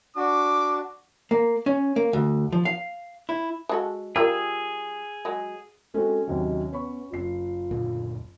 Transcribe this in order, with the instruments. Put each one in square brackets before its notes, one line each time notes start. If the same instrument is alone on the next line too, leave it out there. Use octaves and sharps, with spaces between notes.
[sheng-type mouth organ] D4 F#4 [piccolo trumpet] D6
[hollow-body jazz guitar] A#3
C#4
A#3
D2
F3
F5
E4
[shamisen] G#3 F#4 A4
[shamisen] G3 F4 A#4 [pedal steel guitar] G#4 E6
[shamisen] F#3 G#3
[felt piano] G#3 C4 F#4 [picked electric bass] C#4 [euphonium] A4
[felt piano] D#2 C3 D#3 [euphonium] F#3
[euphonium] B3 [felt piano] C#5 B5 C#6
[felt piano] F#1 C7 [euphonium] F4
[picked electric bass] D2 A#2